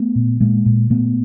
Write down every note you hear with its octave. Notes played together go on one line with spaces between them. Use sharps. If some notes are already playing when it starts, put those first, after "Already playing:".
Already playing: A3 B3
A#2
A#2 G#3 A#3
A#2
A#2 A3 B3